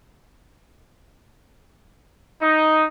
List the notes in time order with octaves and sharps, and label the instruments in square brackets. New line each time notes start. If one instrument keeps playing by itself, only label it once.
[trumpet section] D#4